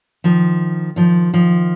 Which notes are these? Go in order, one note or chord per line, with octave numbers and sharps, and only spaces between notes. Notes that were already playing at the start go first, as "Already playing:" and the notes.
D#3 F3
D#3 F3
D#3 F3